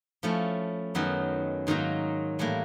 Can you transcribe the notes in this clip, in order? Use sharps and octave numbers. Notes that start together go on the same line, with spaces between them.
F3 A3 C#4 E4
F#2 D#3 F#3 B3
G#2 D#3 F#3 A#3 D#4
A2 E3 G3 A#3